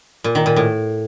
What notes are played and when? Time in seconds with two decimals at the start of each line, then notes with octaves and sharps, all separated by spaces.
0.24 A#2
0.35 D#3
0.46 A#2
0.56 A2